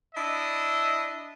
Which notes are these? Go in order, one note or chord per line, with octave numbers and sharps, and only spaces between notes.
D4 E4 D#5